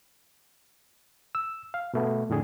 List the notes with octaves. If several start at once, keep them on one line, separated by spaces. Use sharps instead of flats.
E6
F5
B2 A3 B3
F2 A2 D3 G#4